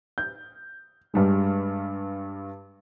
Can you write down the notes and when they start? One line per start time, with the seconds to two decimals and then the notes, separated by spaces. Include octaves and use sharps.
0.18 G6
1.14 G2 G3 G#3